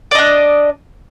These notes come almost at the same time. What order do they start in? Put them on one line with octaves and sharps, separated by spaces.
D5 D#5 D4